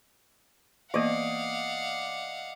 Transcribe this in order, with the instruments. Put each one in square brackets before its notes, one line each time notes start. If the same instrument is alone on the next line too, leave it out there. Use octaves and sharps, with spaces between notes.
[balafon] E3 A#3 B3 [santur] D5 D#5 [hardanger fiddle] F5 F#5